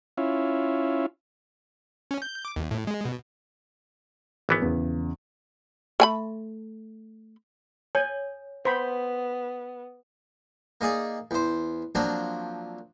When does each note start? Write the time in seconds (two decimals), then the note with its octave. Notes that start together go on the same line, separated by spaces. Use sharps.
0.17 C#4 E4 F4
2.11 C#4
2.22 G6
2.45 D6
2.56 D#2
2.71 A2
2.87 G#3
3.05 B2
4.49 G#1 E3 B3
4.62 E2 C#3
6.00 A3 G#5 B5
7.95 C#5 G#5
8.65 B3 C5 B5
10.81 A#3 D#4 G#4 D5
11.31 E2 C5
11.95 F3 F#3 A#3 C4 D4